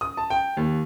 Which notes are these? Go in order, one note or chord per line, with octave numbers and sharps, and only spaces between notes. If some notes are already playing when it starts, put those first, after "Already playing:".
D#6
A5
G5
D#2